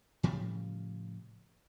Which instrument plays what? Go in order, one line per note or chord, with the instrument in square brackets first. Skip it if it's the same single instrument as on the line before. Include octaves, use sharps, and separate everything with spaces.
[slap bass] A2 C#3 F3 G3